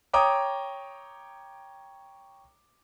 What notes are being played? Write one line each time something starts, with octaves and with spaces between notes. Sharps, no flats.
C#5 G5 A#5 D6 D#6